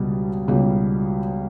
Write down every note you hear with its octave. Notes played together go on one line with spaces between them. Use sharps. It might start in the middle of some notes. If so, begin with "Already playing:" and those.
Already playing: C#2 B2 G3
C#2 B2 G3